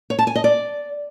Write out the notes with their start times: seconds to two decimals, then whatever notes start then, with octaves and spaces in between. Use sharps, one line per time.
0.10 C#5
0.19 A5
0.27 G#5
0.36 D#5
0.44 D5